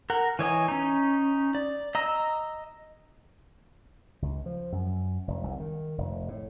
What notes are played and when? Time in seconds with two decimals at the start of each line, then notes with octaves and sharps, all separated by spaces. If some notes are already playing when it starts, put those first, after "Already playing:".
0.10 A#4 F#5
0.39 E3 C#5 D#5 G#5
0.68 C#4 D#4
1.55 D5
1.95 D#5 A#5 E6
4.22 C#2
4.46 F3
4.72 F#2
5.28 F1
5.44 C2
5.60 D#3
5.98 F1
6.28 A2